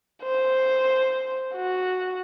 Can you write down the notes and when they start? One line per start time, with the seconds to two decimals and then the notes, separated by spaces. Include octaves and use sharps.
0.23 C5
1.55 F#4